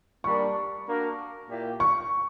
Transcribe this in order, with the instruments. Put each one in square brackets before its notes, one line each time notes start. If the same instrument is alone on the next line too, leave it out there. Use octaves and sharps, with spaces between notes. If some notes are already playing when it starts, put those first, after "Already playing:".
[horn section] G3 A#3 D4 A#4 [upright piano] C#6
[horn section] A#3 D4 F#4 A#4
A#2 A#3 E4 G4
[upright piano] C#6